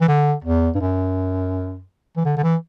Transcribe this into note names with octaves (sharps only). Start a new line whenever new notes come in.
E3
D3
E2
G2
F#2
E3
D3
D3
E3